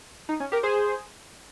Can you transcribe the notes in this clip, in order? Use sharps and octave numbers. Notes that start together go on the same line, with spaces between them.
D#4
C#4
G4 A#4
G#4 C5